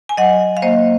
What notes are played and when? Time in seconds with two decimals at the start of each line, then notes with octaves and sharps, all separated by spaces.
0.09 G#5
0.17 F#3 D#5 F#5
0.57 F5
0.62 A#3 C5 D#5